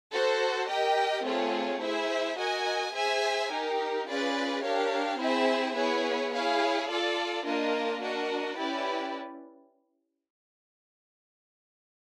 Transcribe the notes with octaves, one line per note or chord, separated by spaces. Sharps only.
F#4 A4 C5
G4 A#4 D#5 G5
A3 C4 F4 G#4 C#5
E4 G#4 C5 E5
F#4 A#4 D#5 G#5
G#4 C5 E5 G#5
D#4 G4 A#4
C#4 F4 G#4 B4 D5
D4 G4 A#4 C#5 F5
C4 E4 G#4 C5 E5
B3 E4 G#4 C#5
E4 G#4 C#5 F5
F4 A4 D5
A#3 D4 F4 A#4 D#5
D4 F#4 A#4 D#5
C#4 E4 G4 B4 D5